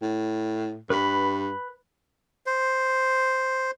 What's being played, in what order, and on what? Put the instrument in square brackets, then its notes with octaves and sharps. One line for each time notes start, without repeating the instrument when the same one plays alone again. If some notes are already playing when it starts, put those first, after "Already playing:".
[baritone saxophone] A2
[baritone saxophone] G2 [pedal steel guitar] B4 B5
[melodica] C5